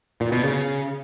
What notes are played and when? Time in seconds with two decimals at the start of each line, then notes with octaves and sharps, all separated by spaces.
0.21 A#2
0.32 B2
0.43 C#3